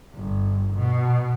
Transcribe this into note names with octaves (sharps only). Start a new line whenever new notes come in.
G1
B2